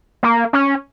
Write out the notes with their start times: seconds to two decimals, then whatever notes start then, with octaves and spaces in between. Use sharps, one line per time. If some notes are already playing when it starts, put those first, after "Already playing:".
0.23 A#3
0.53 C#4